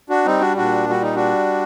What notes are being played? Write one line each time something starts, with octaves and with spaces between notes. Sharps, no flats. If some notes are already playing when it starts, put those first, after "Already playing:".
D4 F#4
G3 C4 D#4
D4 F#4
A#2 D4 F#4
G3 F#4
D#4
D4 F#4